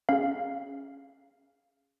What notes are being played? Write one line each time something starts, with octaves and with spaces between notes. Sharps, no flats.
C#4 G#4 F5